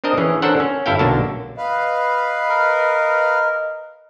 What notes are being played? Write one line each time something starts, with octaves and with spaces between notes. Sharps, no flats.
C4 D4 A#4 D#5 A5
E3 C#4 G#4
C#4 D4 A4 A#4 C5 F#5
C#4
G1 E4 A4 F5 G5
B1 D3 A#3 D4 F#4 A5
B4 D#5 F5
A#4